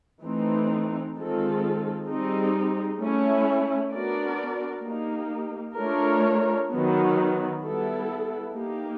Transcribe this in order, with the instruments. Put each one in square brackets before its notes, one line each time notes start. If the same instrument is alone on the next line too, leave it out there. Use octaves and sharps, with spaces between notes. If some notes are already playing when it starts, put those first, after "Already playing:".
[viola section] E3 A3 C4 D#4
D#3 G#3 C4 F4 A4
G3 C4 D#4 G#4
A3 C#4 E4
B3 D4 F#4 A#4 D5
A#3 D#4 G4
A3 D4 F4 A#4 C#5
D#3 F#3 B3
G3 B3 E4 A4
A#3 D#4 G4